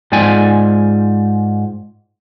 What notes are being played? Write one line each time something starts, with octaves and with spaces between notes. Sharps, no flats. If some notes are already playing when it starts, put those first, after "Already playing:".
G#2 F4 D5 G5 G#5